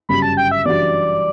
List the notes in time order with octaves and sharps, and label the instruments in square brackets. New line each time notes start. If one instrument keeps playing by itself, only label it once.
[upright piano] G1 F#2 C#3 G3 [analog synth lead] B5
[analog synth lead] A5
G5
E5
[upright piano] F#2 E3 G3 D4 F#4 [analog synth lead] D5